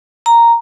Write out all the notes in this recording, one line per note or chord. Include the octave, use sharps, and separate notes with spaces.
A#5